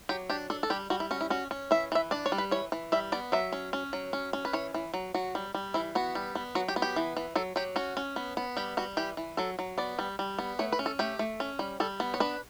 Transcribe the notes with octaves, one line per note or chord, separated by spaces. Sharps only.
F#3 G4
D4 G4
D4 A4
A4
G3 G4
G3 F#4
E4
C#4 F#4
E4
C#4 F#4
C#4
E3 E5
E3 E5
D4 D5
C#5
G3
B4
E3 C#5
E3
G3 E5
B3 D5
F#3 E5
C#4
C#4
F#3
C#4
C#4
B4
E3 C#5
E3
F#3
F#3 F#4
G3
G3
E3 E4
B3 F#4
G3
B3
F#3 F#4
G4
B3
G4
E3
E3
F#3 A4
F#3 G4
C#4 F#4
C#4
B3
B3
G3 G4
G3 F#4
E3 G4
E3
F#3 A4
F#3
B3 D5
G3
G3
B3
A3 C#5
B4
C#4
A4
A3 G4
A3
C#4
G3
G3 A4
B3
C#5
D4 B4